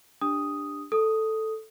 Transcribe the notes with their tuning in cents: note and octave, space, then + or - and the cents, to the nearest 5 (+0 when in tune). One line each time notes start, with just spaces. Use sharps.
D4 +0 G4 +15 D#6 +0
A4 +0 D#6 +0